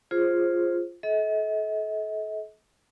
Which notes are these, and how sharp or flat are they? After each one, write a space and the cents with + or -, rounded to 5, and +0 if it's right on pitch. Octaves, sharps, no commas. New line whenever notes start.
F4 +0 G#4 +0 C5 +15
A4 -35 D#5 +45